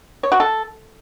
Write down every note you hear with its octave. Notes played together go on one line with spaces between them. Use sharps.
C#5
F#4
A4